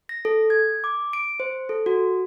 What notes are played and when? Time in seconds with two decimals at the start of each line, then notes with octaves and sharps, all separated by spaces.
0.09 A#6
0.25 A4
0.50 G#6
0.84 D6
1.13 D7
1.40 C5
1.69 A4
1.86 F#4